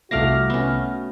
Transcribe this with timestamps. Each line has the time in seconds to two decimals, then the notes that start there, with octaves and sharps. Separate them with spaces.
0.11 C2 A3 F#4 D5 F5 F6 A#6
0.50 B3 C#4